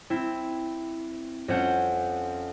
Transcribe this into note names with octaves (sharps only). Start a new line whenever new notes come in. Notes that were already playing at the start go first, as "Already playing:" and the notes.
C4 E4
F2 C#4 C5 F#5 G6